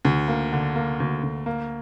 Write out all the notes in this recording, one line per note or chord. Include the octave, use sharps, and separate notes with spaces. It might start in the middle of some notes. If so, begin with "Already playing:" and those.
D2
A#3
D3
A#3
D2
D2
A#3